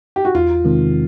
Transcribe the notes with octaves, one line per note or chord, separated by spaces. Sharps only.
G4
F#4
E2 F4
C3 D#3 G#3 C4